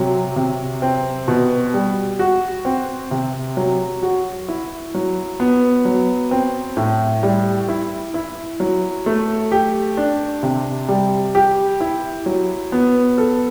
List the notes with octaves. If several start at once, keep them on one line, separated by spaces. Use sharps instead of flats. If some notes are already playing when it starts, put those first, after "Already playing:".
Already playing: C3 F#3
C3
C4
B2
G3
F#4
C4
C3
F#3
F#4
E4
F#3
B3
F#3
C4
A2
G3
E4
E4
F#3
A3
G4
D4
C3
G3
G4
E4
F#3
B3
A4